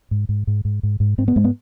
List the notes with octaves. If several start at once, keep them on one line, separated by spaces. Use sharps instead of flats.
G#2
G#2
G#2
G#2
G#2
G#2
G#2 C4
B3
G#2 G#3
B3